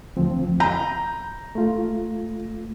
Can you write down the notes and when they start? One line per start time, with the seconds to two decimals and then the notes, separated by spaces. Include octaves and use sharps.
0.17 D2 F3 C4
0.60 A#5 G6
1.55 A3 F4